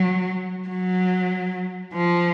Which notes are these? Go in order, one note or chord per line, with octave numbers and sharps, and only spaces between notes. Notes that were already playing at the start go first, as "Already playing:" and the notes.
Already playing: F#3
F#3
F3